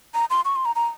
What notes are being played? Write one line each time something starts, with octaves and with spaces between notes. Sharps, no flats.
A#5
C6
C#6
C6
A#5
A#5